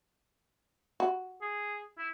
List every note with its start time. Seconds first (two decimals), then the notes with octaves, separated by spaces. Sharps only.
1.00 F#4
1.42 G#4
1.98 E4